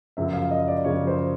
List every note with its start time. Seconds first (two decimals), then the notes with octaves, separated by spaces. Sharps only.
0.17 F#2 C#3 F3 E5
0.33 F5
0.51 D#5
0.68 D5
0.84 F#2 C#3 F3 C#5
1.07 C5